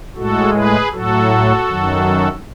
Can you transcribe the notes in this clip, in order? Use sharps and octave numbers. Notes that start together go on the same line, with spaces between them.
A2 G#3 F#4 A4
G#4 B4
A2 F#3 F#4 A4
F#2 D#3 F#3